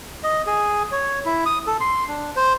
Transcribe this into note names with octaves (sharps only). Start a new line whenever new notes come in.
D#5
G#4
C#5
E4
D#6
A4
C6
D4
C5